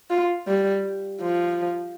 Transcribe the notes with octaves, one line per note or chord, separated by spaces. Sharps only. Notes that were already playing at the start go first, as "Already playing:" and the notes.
F4
G3
F3